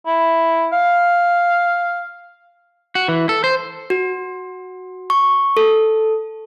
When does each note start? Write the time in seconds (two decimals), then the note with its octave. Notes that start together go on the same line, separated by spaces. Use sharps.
0.06 E4
0.73 F5
2.95 F#4
3.08 E3
3.29 A4
3.44 C5
3.90 F#4
5.10 C#6
5.57 A4